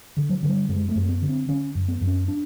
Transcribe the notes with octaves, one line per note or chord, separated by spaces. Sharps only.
D3
F#3
D3
G3
F#2 G#3
A3
F#2
A#3
B3
D3
C4
D3 C#4
F#2
B3
F#2
C#4
D4